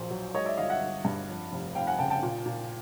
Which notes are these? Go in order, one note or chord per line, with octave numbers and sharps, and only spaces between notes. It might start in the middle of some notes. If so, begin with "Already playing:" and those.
Already playing: A#1 A#2 F#3 C5
F#3
G#3 C#5 D#5
D5 E5
G1 D#5 F5
E5 F#5
G1
G2
F2
F1
F1 F5 G5
F#5 G#5
C#3 G5 A5
G5 A5
A#2
A#2